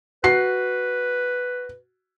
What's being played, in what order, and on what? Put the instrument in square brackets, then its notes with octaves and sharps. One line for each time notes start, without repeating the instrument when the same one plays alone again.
[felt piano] F#4 C7 [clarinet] B4